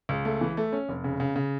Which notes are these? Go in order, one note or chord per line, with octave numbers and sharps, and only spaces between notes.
C#2
A3
E3
A3
C#4
F1
C#3
C#3
C#3